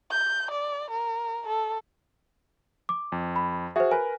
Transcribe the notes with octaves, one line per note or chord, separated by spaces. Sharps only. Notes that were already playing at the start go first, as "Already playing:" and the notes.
G6
D5
A#4
A4
D6
F2
B5
F#4 G#4 C5 E5
A#4 B4 G#5